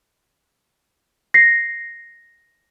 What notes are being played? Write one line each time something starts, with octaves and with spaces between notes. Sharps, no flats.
A#6 C7